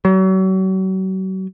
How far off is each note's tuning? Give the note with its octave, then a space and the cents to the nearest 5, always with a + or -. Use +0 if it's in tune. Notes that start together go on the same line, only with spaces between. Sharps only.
F#3 +40